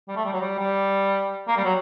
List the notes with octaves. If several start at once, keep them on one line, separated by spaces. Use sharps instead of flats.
G3
A3
G3
F#3
G3
G3
A#3
G3
F#3